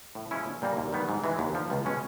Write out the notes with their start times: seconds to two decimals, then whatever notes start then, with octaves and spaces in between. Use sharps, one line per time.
0.15 A2
0.31 F3 G#3 C#4 E4
0.46 A#1
0.62 A#2 G3 A#3
0.77 D#2
0.93 D#3 G3 B3
1.09 G#2
1.24 E3 G#3
1.39 D#2
1.54 D3 F3
1.70 C#2
1.85 B2 G#3 C#4